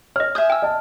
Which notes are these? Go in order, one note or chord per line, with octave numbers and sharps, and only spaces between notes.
C#5 D#5 F6
E5 G#5 D#6 G6
G5 E6
D#5 A5